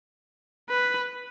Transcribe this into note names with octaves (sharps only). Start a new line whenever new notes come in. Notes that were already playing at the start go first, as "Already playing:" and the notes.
B4